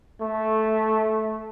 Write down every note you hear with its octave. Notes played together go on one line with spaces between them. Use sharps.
A3